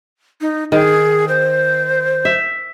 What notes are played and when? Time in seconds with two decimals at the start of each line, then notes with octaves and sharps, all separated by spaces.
0.41 D#4
0.72 D#3 G#4
1.28 C5
2.25 E5